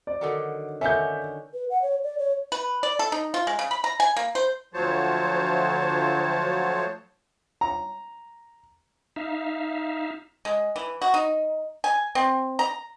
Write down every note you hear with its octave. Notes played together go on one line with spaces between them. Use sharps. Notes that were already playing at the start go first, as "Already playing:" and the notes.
D5
D3 D#3 F#3
D3 D#3 C#4 E5 G6
B4
F#5
C#5
D5
C#5
B4
D5
A4
D#4
F4
G#3
C#3
B5
A#5
G#5
A#3
C5
D2 F3 F#3 C5 C#5 A5
A#5
D#4 E5 F5
G#3
E3
F#4
D#4
G#5
C4
A#5